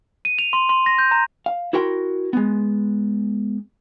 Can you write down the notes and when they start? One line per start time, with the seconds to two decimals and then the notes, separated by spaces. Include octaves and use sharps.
0.25 D#7
0.39 F7
0.53 C6
0.69 C6
0.86 A#6
0.98 G6
1.11 A#5
1.46 F5
1.73 E4 F#4 A#4 G5 C6
2.33 G#3 B3